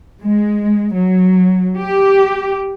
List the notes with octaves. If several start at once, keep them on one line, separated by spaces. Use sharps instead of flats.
G#3
F#3
G4